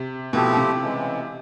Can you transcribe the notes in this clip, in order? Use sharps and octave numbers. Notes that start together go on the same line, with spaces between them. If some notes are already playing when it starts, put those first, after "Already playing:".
Already playing: C3
B2 F3 A3 C4 E4 G4
C3
C#3 E3 G#3